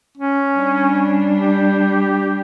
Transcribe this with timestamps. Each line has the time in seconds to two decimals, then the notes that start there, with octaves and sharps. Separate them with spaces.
0.17 C#4
0.55 G3 D4
1.35 G4